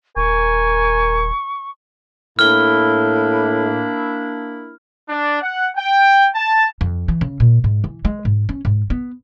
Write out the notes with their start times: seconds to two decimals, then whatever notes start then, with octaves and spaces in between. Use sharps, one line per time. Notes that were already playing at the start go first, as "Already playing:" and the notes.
0.17 D#1 A#4 G#5 C#6
2.39 A2 A#3 D4 E4 F6 G7
5.10 D4
5.42 F#5
5.77 G5
6.36 A5
6.81 F2
7.08 E3
7.21 C#3
7.40 A#2
7.64 G#2
7.84 E3
8.05 G#3
8.25 G#2
8.49 C#4
8.65 G#2
8.90 B3